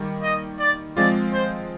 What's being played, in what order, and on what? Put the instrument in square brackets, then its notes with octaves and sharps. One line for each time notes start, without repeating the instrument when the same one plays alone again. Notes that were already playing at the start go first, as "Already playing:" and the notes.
Already playing: [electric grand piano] D#3 G3 A#3
[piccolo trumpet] D#5
D5
[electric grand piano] F3 G#3 C4 F4 [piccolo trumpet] D5
[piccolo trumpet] C5